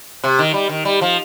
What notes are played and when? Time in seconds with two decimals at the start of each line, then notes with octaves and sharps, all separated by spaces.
0.24 C3
0.39 D#3
0.54 G3
0.70 D#3
0.85 G3
1.01 F3